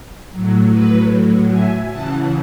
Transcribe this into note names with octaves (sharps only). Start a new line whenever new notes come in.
A2 F#3
B4
E5 G#5
C#3 E3 F#5 A5